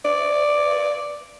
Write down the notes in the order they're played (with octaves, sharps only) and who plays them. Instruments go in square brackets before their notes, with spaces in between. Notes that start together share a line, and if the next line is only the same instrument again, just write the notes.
[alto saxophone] D5